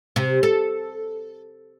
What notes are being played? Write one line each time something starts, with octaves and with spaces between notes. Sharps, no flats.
C3
A4